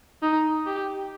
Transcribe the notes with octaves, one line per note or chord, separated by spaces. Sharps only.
D#4
G4